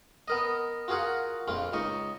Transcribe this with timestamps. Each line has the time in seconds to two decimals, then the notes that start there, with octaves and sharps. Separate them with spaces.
0.28 B3 A#4 D#5
0.88 F4 F#4 G#4 A#4 F#5
1.48 A#1 F2 F4
1.73 C#2 D#4 D#5 C#6